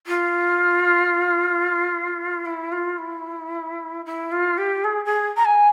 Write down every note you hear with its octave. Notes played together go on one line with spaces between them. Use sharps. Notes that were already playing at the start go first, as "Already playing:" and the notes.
F4
E4
F4
E4
E4
F4
G4
G#4
G#4
A#5
G#5